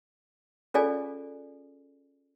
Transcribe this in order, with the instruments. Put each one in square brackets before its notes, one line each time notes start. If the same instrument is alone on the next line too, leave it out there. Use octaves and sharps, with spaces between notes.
[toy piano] C#4 F4 G#4 A4 D5 G#5